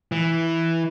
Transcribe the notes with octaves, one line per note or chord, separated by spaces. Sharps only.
E3